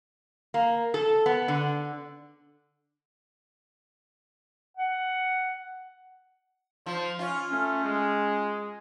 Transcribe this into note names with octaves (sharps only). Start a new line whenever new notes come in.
A#3
A4
B3
D3
F#5
F3 C5
C#4 F4
A3 C#4
G#3